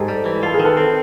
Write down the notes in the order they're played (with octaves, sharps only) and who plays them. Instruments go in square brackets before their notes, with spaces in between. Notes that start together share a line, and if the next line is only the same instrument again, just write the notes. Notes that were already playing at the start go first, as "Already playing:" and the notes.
Already playing: [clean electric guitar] G#2 [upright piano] G4 A4
[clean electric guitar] G3
E3
[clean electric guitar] F4 [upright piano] A4
[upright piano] G#4 A#4
[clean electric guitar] D#3
[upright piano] A4 B4
[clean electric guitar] C4